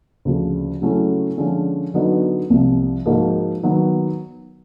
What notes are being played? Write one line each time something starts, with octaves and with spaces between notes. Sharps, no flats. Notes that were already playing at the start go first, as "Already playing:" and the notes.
D2 C#3 F3
C#3 F#3 A3 C#4 E4
D3 F3 G#3 C#4
D3 F#3 B3 D#4 F#4
C2 C3 F3
G#2 F3 A#3 D#4 F#4
D#3 F#3 B3